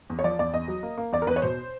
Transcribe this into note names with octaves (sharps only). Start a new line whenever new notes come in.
E2
C#5
F3 D5
E2 D5
E2 D#5
F#3
A#3
A#3
E2 D5
A#4
E2 B4
C#5
B2 C5